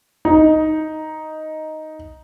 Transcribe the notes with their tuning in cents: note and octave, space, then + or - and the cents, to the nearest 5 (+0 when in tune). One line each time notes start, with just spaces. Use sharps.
D#4 +5